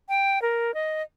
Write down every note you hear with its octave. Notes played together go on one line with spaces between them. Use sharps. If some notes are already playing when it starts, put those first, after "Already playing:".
G5
A#4
D#5